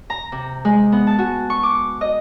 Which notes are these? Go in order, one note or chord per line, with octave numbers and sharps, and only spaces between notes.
A#5
C3
G#3
B3
A5
F#4
C#6
D6
D#5